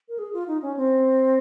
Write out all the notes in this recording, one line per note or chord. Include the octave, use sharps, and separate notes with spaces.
A#4
G#4
F4
D#4
C#4
C4